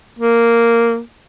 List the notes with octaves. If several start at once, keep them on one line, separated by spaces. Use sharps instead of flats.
A#3